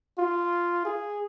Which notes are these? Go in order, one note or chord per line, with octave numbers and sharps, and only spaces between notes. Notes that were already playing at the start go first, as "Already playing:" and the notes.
F4
G#4